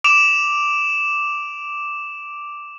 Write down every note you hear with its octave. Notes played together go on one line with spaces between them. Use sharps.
D6 D7 E7 F7